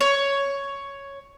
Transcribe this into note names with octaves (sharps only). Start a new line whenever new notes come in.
C#5